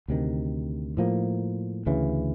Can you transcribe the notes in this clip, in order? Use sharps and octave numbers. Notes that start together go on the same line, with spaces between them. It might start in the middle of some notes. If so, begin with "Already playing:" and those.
D2 C3 D#3
A2 F3 A#3
D2 C#3 E3